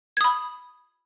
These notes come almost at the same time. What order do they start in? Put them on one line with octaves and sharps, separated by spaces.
G#6 D#6 B5